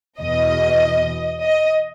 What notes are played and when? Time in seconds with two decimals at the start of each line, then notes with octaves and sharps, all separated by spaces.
0.20 E2 B2 D#5
1.43 D#5